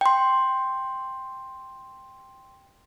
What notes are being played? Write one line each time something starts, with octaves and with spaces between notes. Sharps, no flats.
G5 C6